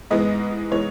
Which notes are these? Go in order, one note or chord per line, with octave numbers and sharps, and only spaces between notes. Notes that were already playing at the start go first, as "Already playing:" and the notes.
G#2 E3 G#3 B3 D#5
E3 G#3 B3 C#5